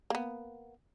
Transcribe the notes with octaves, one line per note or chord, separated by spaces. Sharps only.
A#3 B3